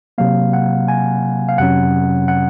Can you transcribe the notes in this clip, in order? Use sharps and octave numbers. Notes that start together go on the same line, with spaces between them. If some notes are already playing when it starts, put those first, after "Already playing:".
C3 F#3 A#3 F5
F#5
G#5
F5
F2 C3 F#3 C#4 F#5
F#5